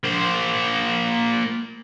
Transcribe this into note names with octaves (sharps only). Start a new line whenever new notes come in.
A#3 C5